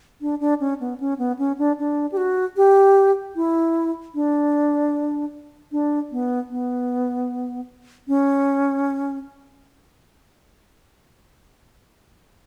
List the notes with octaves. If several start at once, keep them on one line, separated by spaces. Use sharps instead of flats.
D4
D4
C#4
B3
C#4
B3
C#4
D4
D4
G4
F#4
G4
E4
D4
D4
B3
B3
C#4